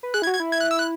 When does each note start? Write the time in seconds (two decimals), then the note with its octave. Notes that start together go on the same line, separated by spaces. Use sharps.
0.03 B4
0.14 G#4 F#6
0.22 E4 G#6
0.27 F#4
0.33 G#6
0.40 E4
0.52 G#6
0.61 F#6
0.71 E6
0.80 F#6